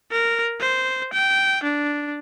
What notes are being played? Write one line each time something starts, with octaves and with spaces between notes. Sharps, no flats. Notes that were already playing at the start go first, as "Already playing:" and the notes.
A#4
C5
G5
D4